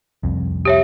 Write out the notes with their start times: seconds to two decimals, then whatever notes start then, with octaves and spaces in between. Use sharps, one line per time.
0.23 C2 F2
0.65 G4 C#5 E5